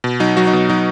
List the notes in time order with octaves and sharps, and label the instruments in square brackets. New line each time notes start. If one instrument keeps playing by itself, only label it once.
[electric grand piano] B2
F#3 D#4
F#3 F#4
D#4
B2
F#3 D#4